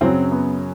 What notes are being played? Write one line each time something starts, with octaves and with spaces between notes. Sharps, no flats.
F#2 C#3 F#3 C4
B3